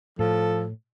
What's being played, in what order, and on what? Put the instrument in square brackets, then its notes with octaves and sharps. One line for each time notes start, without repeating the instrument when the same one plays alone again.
[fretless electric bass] A2 [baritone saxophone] F3 [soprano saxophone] A4